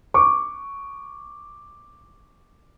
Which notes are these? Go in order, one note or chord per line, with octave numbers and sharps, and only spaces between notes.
C#6 D6